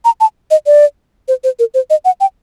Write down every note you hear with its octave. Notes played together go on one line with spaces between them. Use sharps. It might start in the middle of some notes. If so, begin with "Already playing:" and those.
A#5
A5
D#5
D5
C5
C5
A#4
C5
D#5
F#5
G5